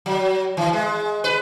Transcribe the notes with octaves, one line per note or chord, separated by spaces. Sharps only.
F#3
E3
G#3
B4